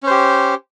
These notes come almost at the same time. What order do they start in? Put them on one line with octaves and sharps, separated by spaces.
C#4 C5 G4